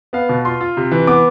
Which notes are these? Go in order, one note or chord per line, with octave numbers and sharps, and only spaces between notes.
B3 F5
B2
F4 C6
F4
C3
E3
B3 D6